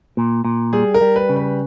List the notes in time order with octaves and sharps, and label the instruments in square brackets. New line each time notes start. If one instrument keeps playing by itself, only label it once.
[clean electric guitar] A#2
A#2
[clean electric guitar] G3 [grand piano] G#4
[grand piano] A#4
[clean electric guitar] G3
[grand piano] B4
[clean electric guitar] C#3
[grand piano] B4